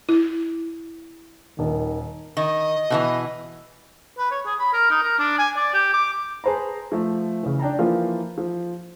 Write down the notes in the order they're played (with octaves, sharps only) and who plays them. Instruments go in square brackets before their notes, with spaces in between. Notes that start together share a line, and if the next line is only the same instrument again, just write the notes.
[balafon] E4
[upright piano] D#1 [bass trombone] D#3
[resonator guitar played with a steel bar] D#3 [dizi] D#5
[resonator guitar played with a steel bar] B2 D#3 E3
[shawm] B4
C#5
G#4
B5
A#4
D#4
A#4
D4
G#5
D5
G4
D6
[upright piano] G#4 B4 C5 A5 A#5
F3 A3
C#3 E3
D4 G5 A5 A#5
E3 F3 A#3 F4
F3